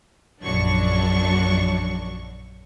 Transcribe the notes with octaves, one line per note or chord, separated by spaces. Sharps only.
A#1 F#2 F#3 D4 C#6